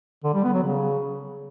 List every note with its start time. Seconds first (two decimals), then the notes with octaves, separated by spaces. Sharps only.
0.24 D3
0.34 G3
0.44 B3
0.54 F#3
0.64 C#3